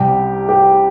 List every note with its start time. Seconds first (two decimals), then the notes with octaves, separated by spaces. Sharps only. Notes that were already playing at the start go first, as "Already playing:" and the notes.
Already playing: C2 C3 G3 G4
0.49 G4